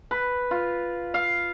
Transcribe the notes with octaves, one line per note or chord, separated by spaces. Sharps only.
B4
F4
F5